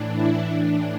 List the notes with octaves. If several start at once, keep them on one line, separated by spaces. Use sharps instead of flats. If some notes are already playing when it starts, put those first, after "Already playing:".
Already playing: A2 E3 D4
E4
A2 E3 D4